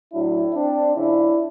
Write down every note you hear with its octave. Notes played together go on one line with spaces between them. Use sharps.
A2 F#3 D4 E4
C4 D4
C#3 F3 D4 E4